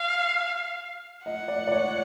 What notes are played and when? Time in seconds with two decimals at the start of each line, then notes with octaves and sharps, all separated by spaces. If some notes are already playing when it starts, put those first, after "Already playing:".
Already playing: F5
1.25 D#5 F#5
1.48 D5
1.67 D5
1.72 C#5